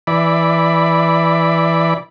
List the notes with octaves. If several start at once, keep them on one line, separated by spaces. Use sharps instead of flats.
E3 D5 B5